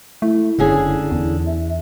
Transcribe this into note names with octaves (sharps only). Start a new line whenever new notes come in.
A3 E4
F#1 D3 C#4 G#4
E2
E5